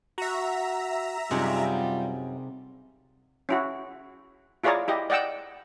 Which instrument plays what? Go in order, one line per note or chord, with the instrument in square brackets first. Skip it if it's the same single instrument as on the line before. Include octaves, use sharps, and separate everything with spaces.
[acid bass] F#4 [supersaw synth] E5 A#5
[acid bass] F#2 [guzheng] C3 D#4 G#4 [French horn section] G3 F4
[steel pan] C#4 E4 F#4
E4 F4 G#4 C#5 D5 A#5
E4 G4 D#5
D5 D#5 F#5 G5 E6